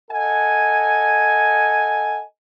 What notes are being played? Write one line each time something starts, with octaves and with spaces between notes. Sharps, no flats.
A4 D#5 F#5 G#5